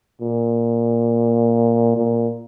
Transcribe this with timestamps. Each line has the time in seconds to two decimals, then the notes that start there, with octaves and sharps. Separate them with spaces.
0.21 A#2
1.96 A#2